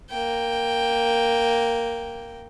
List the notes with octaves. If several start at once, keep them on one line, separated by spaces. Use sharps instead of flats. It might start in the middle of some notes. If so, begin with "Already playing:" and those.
A#3 G5